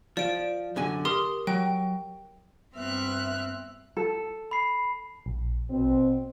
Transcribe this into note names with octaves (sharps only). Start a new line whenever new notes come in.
F3 D5 D7
F#2 D3 G#5
G4 A#4 C6 D#6
F#3 G5
G2 B3 C4 E5 F6 F#6
A4
B5 C7
A#1
B2 C4